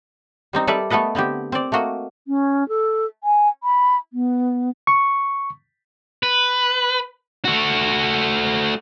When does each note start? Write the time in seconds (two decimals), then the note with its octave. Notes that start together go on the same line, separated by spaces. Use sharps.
0.53 G3 C4 D#4
0.67 G3 A4 B4 D5 E5
0.90 A3 B3 A4 B4 D#5
1.15 D3 B3 C4 G4
1.52 C4 D5
1.72 A3 A#3 F#4 D#5
2.27 C#4
2.68 A4
3.23 G#5
3.63 B5
4.13 B3
4.87 C#6
6.23 B4
7.45 A3 F#4